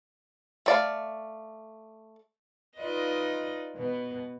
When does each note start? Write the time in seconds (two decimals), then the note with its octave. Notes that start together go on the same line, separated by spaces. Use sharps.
0.66 A3 D5 F5
2.78 D#4 F4 B4 D5 D#5
3.76 B2 B3